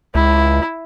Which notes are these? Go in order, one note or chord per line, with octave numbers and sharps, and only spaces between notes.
C#2 E4